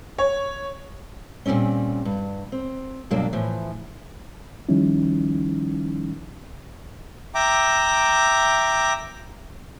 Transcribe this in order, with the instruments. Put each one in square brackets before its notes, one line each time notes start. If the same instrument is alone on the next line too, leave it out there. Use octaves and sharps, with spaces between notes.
[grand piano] C#5
[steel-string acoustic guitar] A#2 F3 G3 C4 C#4
G2
C4
G2 B2 F#3 A#3 D4
A2 E3 F3
[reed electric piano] D#3 F3 G3 C#4 D#4 E4
[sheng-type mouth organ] E5 G5 A#5 D6